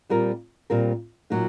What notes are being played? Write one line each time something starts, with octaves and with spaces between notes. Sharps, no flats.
A#2 G3 C4 F4 A#4
A#2 G3 C4 F4 A#4
A#2 F#3 A#3 D#4